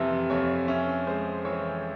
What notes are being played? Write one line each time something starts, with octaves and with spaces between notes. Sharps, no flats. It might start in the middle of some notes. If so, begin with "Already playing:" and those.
Already playing: F2 C3 E3 E5
F2 C#5
C#4 E5
G#3 C5
E3 C#5